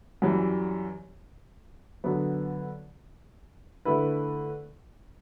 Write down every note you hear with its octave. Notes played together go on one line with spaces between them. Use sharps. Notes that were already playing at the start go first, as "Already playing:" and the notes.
F#2 E3 G3
D3 F#3 B3
D3 A3 E4 B4